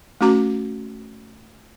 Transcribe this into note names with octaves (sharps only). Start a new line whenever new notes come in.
A3 C#4 F#4 A#5 D6